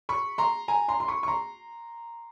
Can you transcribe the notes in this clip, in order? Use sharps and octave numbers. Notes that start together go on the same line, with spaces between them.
B5 C#6
A#5 C6
G#5 A#5
A#5 C6
C6
B5 C#6
C#6
A#5 C6